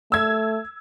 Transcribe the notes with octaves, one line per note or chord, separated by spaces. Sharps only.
A3 E6 G#6